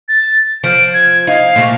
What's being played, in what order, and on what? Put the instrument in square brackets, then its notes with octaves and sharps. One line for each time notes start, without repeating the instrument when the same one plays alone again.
[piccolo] A6
[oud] F3 [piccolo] D7
[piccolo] G#6
[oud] D#4 [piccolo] F5
[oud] A#2 A3